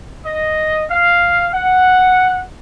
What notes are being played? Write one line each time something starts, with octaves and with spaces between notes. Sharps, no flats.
D#5
F5
F#5